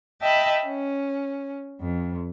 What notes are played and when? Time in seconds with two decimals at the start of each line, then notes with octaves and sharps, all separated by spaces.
0.21 D#5 E5 G5 A5 B5
0.65 C#4
1.80 F2